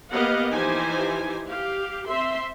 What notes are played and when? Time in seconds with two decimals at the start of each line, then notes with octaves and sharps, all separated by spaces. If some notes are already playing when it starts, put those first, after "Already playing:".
0.12 A#3 B3 G4 D#5 F5 F#5
0.53 E3 F3 D#4 G4 C5 G#5
1.47 G4 F5
2.07 C4 E5 C6